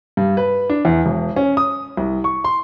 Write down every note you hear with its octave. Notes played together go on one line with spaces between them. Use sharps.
G2
B4
D4
E2
E1
C#4
D#6
C2
C#6
C6